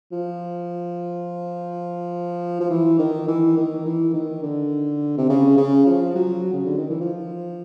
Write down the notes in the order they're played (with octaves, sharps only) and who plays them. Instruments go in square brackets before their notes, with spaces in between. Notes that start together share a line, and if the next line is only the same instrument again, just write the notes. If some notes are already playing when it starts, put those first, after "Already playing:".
[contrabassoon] F3
F3
E3
D#3
E3
D#3
E3
D#3
D3
C3
C#3
C#3
F3
F#3
C#3
D3
D#3
E3
F3